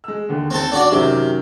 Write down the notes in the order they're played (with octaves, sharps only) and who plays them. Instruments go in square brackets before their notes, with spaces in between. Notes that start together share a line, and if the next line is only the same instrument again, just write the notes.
[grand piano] G#3 E6
D#2 D3
[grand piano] D#2 A5 [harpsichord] C4 A4
[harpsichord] D4 F#4 D5
[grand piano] F#2 D#3 F#3 [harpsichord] C3